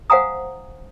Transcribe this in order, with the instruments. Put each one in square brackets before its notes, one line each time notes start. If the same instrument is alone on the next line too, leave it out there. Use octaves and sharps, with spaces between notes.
[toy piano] C5 F5 F#5 G#5 A#5 D#6